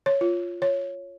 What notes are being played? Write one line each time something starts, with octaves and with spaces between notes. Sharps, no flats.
C#5
F4
C#5